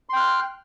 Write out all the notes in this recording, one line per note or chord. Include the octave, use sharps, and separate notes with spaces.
G5 C6 F6 F#6